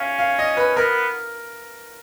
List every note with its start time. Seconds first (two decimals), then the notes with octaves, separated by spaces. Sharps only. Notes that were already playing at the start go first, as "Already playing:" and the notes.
Already playing: C#4 F5
0.19 F5
0.39 D#5
0.57 B4
0.77 B3 A#4